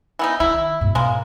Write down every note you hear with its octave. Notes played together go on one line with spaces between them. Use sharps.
E3 B3 D#4
D#3 E4
G#2 B2
G#3 A#3